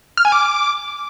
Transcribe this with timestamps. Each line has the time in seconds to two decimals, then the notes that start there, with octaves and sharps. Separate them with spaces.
0.17 F6
0.25 G#5
0.32 D6